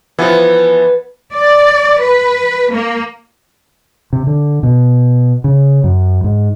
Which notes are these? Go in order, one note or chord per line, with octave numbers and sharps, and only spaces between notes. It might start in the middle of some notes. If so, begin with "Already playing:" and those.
E3 F3 B3
D5
B4
A#3
C3
D3
B2
C#3
F#2
G#2